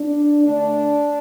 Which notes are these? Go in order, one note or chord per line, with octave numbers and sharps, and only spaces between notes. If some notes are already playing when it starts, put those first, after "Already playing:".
Already playing: D4
D3 A3 D4